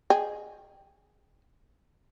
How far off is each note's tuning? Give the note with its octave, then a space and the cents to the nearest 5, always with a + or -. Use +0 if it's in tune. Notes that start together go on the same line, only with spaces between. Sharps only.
G#4 +0 D#5 -20 G5 +5